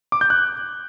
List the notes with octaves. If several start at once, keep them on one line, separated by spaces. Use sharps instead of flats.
D6
G6
F#6